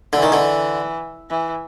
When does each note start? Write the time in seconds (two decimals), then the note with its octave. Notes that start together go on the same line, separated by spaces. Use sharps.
0.13 D3 E3
0.23 D#3
0.32 D3
1.30 E3